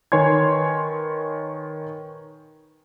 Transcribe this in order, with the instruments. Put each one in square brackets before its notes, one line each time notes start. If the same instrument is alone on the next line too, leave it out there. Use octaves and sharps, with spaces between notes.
[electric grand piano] D#3 B4 C#5 G#5 C6 G#6